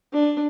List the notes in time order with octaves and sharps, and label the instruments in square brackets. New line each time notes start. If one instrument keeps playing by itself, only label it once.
[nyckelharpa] D4